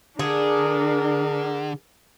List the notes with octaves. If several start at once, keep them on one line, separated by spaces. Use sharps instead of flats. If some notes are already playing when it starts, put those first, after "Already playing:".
D3 D4 G#4 A#4